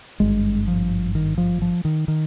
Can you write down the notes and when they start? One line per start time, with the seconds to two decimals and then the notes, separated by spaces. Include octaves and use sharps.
0.20 G#1 G2 G#3
0.68 F3
1.15 D#3
1.38 F3
1.62 F3
1.85 D#3
2.08 D#3